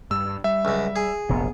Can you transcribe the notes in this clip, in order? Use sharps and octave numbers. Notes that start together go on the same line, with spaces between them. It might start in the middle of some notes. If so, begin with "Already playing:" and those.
G2 E6
G3 E5
C#2 F#2
G#4
F1 A#1 F#2 B3